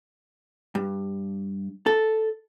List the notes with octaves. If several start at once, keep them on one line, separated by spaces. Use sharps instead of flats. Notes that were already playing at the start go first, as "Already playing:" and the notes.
G2
A4